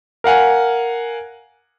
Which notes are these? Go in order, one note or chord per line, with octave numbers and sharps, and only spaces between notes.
A#4 F5 F#5 G#5